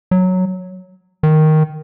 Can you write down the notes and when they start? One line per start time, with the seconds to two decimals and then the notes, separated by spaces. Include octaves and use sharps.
0.11 F#3
1.23 D#3